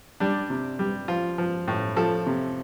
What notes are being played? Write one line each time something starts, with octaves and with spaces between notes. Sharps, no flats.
G3 D4
C3
G3
F3 F4
F3
A2
F3 A4
C3